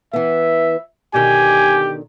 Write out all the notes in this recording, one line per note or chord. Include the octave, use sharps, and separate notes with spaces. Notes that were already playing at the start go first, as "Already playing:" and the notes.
E3 B3 E5
B2 D3 D#3 G4 G#5